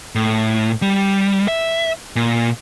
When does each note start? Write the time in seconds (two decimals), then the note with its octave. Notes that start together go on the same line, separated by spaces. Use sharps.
0.15 A2
0.82 G3
1.48 E5
2.16 A#2